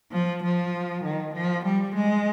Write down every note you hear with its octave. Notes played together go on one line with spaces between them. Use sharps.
F3
F3
D#3
F3
G3
G#3